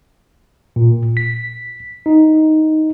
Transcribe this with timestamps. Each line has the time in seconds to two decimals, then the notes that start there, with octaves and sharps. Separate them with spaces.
0.76 A#2
1.17 B6
2.06 D#4